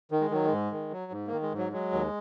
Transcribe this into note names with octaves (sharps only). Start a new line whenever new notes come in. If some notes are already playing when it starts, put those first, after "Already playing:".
D#3
G#3
D#3 F#3
G#3
G#2
D#3
F#3
G#2
A#3
D#3
G#3
G#2 F#3
F#3 G#3
D#2